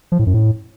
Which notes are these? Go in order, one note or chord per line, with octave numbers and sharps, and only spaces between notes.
F3
A2
F#2
A2